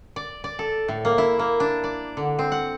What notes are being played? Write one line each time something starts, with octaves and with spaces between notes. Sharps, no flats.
D5
D5
A4
A2
A#3
E4
A#3
D4
D5
D3
C4
F#5